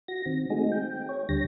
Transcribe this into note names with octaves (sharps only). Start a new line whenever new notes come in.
F#4 A#6
D#3 C4
G#3 A3 C4 D#4 F#4 G#4
G5
C#5
D2 D3 G3 A#6